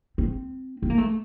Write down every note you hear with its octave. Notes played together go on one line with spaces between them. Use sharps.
C4
C4
A#3
A3